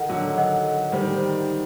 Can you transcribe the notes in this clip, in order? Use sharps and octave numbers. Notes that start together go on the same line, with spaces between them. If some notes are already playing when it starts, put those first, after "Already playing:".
Already playing: D#3 A4 D#5 F#5
D3 F#3
A4 D#5 F#5
D#3 G3 D#4 G4 C5